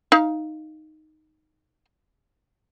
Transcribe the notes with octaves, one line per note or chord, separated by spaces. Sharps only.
D#4 F5